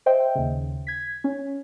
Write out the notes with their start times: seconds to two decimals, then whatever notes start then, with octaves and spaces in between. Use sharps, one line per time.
0.06 C5 D#5 E5 G5
0.35 D#2 C#3
0.87 G#6 B6
1.24 C#4